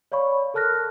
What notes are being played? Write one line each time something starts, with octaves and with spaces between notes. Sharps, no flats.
C#5 D5 F5 B5 C#6
A4 A#4 A5 F6 F#6 A#6